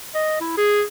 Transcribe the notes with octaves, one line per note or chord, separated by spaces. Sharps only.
D#5
E4
G#4